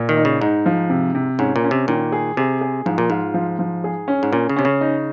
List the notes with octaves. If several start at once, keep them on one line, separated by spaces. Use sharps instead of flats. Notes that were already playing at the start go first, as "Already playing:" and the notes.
Already playing: A#2
D#3
D#4
C#3
G#2 D#4
F3
C3
C3
G#2 C#4
A#2
C#4
C3
A#2 D#3
G#4
C3 G#4
G#4
G#2 F3
A#2
G#2 F4
F3
F3
G#4
C#4
G#2
A#2 C#4
C#3
C3 C#4
C#3
D#4